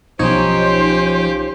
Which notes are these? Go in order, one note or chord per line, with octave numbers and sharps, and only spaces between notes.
B1 F3 C#4 D#4 G4 C5 C#5